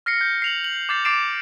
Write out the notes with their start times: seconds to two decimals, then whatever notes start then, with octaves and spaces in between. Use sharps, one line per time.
0.06 F6 A#6 C7 C#7
0.21 G6
0.42 C7 F7 F#7
0.64 F#7
0.89 D6 G6 A6 C7
1.05 D6 A6 C7 D7 E7